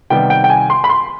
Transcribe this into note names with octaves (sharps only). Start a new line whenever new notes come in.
C3 D#3 G3 B3 G5
G5
G5
G#5
C6
B5
C6